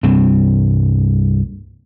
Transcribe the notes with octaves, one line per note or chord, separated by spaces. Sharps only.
C2 G2 C4